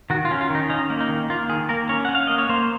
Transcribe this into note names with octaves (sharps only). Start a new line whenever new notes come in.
D#3 F#4
F4
C#4
F4
D#3 D#4
C#4 D#4
A#3
D#4
D#3
A#3 F4
D#3 G#4
A#3 A#4
C#4 C#5
C#4 F#5
F5
A#3 D#5
C#5
A#3 C5